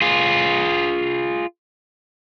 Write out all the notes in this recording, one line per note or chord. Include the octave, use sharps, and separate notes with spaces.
F4 G#4